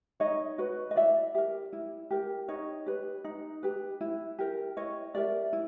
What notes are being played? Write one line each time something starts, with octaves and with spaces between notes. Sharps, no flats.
D#4 C#5 D#5
F#4 B4
D#5
E4 D5 E5
G4 A#4
E4
G4 A#4
D#4 C#5 D#5
G4 B4
D#4
G4 B4
E4
G4 A#4
E4 C#5 D#5
G4 A#4 D5 E5
E4